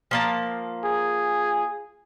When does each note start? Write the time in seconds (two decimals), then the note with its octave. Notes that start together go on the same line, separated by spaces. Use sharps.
0.11 F3 A#3 A5
0.85 G#4